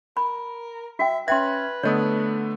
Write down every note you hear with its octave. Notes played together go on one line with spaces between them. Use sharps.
A#4 B5
F#4 E5 G5
C#4 B4 E5 G5 C6 G#6
D3 A3 B3 C#5 D#5 D#6